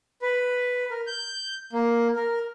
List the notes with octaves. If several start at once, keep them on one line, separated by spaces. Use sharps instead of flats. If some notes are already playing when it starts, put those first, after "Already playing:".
B4
A#4
G6
A#3
A#4